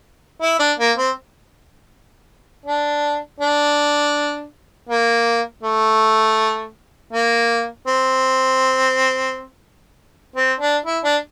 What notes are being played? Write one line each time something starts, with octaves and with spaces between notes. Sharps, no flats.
E4
D4
A#3
C4
D4
D4
A#3
A3
A#3
C4
C4
D4
E4
D4